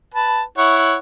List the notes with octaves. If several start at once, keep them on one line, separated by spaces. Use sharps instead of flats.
B4 A5
E4 C#5 F#5